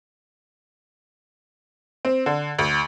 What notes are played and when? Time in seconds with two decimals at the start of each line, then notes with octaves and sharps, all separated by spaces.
2.05 C4
2.26 D3
2.59 D2